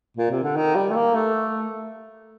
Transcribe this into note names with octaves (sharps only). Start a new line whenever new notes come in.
A#2
C3
D3
D#3
G3
A3
A#3
A3